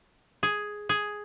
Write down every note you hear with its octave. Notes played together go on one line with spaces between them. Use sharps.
G#4
G#4